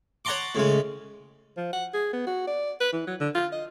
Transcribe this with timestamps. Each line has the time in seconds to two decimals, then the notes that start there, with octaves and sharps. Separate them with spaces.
0.25 C#5 F#5 A5 A#5 C6 D6
0.55 A2 C#3 G#3
1.57 F3
1.73 F#5
1.94 G#4
2.13 B3
2.27 F#4
2.47 D5
2.81 B4
2.93 E3
3.07 F#3
3.20 D3
3.35 F4
3.52 D#5